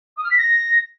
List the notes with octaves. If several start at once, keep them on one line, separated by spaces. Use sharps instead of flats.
D#6
F6
B6
A#6